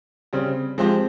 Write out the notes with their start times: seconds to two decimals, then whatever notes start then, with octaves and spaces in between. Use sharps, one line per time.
0.33 C#3 G3 C4
0.78 F3 G#3 C4 G4 C5